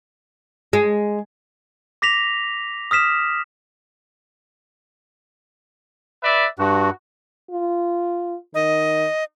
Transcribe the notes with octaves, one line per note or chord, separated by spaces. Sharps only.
G#3
D6 A#6 B6 F7
D#6 F6 B6 E7
B4 D5 E5
G2 F#4
F4
D#3 D#5